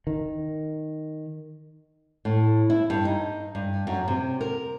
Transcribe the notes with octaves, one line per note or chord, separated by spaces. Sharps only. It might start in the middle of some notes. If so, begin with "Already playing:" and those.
D#3
A2
E4
G2
D#4
G2
F#2
C3
A#4